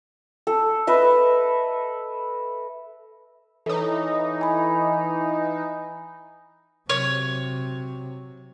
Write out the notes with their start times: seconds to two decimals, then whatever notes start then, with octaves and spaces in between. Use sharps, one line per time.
0.47 A4
0.87 B4 D#5 E5
3.66 E3 D#4 A4 C#5
4.41 G#5 B5
6.89 C3 F#3 C#5